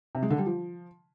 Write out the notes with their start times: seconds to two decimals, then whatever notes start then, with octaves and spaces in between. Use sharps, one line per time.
0.15 C3
0.23 G#3
0.30 D3
0.38 G3
0.46 F3